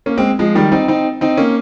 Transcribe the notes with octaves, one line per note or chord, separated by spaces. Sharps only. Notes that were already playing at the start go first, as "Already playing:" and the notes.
A#3 C#4
G#3 C4
F3 G#3
D#3 G3
C4 D#4
C4 D#4
C4 D#4
A#3 C#4